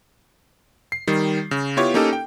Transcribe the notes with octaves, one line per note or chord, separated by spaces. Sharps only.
C7
D#3 G3
C#3
B3 E4 F4 G4 C#5
A#3 C#4 D#4 G4 A4
G5